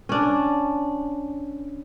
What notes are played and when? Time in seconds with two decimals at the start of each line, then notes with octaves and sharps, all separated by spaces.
0.09 C#4 D4